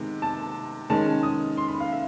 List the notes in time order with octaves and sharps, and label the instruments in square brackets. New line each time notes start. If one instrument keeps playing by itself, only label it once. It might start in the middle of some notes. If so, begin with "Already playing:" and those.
Already playing: [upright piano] C3 D#3 G#3 B3
A5
D#3 G#3 C#4 A5
D#6
C6
B5
F5
E5